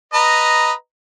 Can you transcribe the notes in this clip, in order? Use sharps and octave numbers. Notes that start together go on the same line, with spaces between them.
B4 D#5 A#5